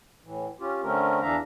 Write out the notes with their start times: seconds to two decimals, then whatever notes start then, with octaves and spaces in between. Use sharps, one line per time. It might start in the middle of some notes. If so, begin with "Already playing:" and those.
0.24 A2 E3
0.60 C#4 F4 G4
0.83 D3 A3 C4 C#4 A#4
1.22 E2 E3 D4 E5 F5 A#5